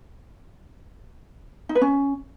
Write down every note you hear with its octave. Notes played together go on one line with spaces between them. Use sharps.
D#4
B4
C#4